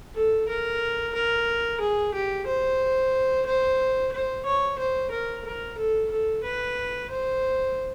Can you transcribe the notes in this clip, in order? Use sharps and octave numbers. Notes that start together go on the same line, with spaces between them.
A4
A#4
A#4
G#4
G4
C5
C5
C5
C#5
C5
A#4
A#4
A4
A4
B4
C5